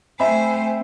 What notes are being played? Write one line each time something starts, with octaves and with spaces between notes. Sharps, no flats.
A3 C4 C5 E5 G#5 B5